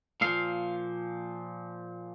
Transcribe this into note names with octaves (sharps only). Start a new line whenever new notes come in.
A#2 F3 F5